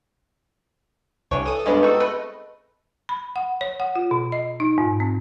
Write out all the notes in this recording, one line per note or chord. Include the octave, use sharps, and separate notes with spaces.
C2 C#4 D4 C#5
E3 A4 D#6
G2 G#3 B3 C#4 D5
C4 D#4 F#4 A4 D#5
A3 B4
B5
F#5
C#5
F#5
F4
B2
D#5
D#4
G#2
C4